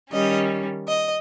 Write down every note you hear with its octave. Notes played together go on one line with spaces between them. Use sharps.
D#3 G3 C#4 D#5
D#5